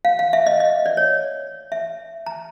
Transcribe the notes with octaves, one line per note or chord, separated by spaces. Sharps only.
F5
F5
E5
D#5
D#5
D5
C#5
E5
A#5